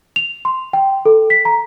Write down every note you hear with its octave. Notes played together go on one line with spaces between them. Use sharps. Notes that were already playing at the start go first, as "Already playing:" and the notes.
F7
C6
G5
A4
B6
A#5